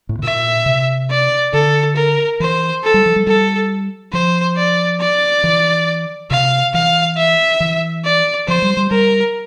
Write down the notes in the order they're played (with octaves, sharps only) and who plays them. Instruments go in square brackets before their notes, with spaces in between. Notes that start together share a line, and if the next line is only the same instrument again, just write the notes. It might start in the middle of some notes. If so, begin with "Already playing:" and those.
[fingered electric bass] A2
C3
[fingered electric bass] A#2 [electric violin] E5
[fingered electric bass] C3
[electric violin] D5
[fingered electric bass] D3 [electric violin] A4
[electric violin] A#4
[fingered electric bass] E3 [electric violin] C5
[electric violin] A4
[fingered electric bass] G3
F3
G3
[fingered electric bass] G3 [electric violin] A4
[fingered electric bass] F3 [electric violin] C5
[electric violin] D5
D5
[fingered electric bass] E3
[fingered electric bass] C3 [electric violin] F5
[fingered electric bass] E3 [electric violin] F5
[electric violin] E5
[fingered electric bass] E3
[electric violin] D5
[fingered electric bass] F3 [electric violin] C5
[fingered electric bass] G3
G3
[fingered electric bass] G3 [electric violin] A#4